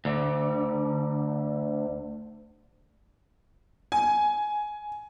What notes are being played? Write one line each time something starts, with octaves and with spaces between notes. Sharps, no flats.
D2 D3
G#5